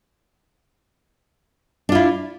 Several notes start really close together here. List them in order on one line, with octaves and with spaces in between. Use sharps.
D4 F4 E4